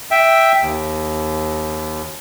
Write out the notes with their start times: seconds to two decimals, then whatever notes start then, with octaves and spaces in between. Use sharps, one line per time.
0.11 E5 G5
0.62 D#2